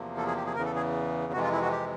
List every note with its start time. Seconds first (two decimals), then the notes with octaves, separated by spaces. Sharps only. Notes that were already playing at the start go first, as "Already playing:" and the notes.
Already playing: E2 C3 F3 A#3
0.17 A4
0.27 G#4
0.37 G4
0.46 G#4
0.56 E2 C#3 E3 A#4
0.65 A4
0.75 G#4
1.33 F2 C3 E3 G#3 F#4
1.42 F4
1.52 E4
1.62 F#4
1.72 G4